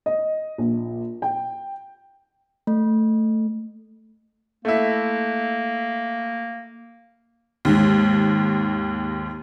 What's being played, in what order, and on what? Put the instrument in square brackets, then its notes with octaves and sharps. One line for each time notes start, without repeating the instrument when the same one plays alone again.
[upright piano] D#5
A#1
G5
[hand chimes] A3
[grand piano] A3 E4 [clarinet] A#3
[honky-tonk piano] D#2 G#2